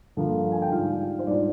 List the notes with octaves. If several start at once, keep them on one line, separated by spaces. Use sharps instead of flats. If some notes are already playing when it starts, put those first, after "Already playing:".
G2 D3 F3 A#3
G#5
G5
G#2 G3 D4 F4 F5
C5
G#2 G3 D4 F4 D5